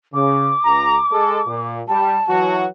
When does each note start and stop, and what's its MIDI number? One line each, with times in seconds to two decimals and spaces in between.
0.14 0.51 49
0.14 1.74 86
0.65 0.98 37
0.65 0.98 82
1.12 1.41 56
1.12 1.41 69
1.47 1.82 46
1.88 2.18 55
1.88 2.56 81
2.29 2.66 52
2.29 2.66 54
2.29 2.66 66